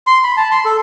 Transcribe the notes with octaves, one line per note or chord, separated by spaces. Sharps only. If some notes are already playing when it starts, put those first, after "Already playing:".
C6
B5
A5
C6
A4